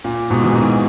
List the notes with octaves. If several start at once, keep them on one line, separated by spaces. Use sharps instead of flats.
A#2
G#2 B2
E3
B2 D#3